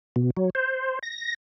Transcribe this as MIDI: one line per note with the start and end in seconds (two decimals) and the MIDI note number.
0.16 0.30 47
0.37 0.50 54
0.55 0.99 72
1.03 1.34 94